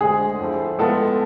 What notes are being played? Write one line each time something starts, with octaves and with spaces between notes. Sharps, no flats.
D2 D3 G#3 C4 G#4
A2 F3 A3
A2 G#3 B3 F4 A4